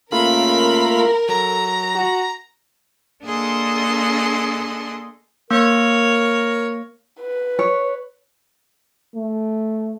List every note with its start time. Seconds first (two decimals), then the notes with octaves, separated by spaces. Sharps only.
0.12 C#3 A3 A#3 F4 A#4 B5
1.29 F#3 A4 A#5
1.95 F#4
3.23 A#3 D4 G#4 A4 D#5 C6
5.51 A#3 A#4 C#5
7.21 B4
7.59 C#5
9.15 A3